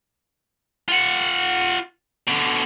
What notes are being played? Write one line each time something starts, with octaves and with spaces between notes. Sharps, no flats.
F4 F#5
B2 D3